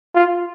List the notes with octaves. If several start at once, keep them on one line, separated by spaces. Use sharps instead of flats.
F4